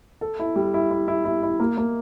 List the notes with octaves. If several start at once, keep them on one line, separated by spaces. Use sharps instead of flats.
A4
E4
G3
E4
E4
E4
E4
E4
A#3
A#3